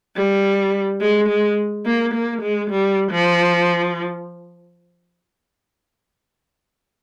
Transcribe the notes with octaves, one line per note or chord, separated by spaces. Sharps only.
G3
G#3
G#3
A#3
A#3
G#3
G3
F3